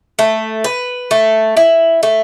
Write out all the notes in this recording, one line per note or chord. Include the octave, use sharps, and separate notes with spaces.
A3
B4
A3
E4
A3